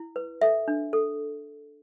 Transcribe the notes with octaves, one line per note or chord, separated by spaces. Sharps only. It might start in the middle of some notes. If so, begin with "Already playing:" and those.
Already playing: E4
B4
A4 E5
D4
A4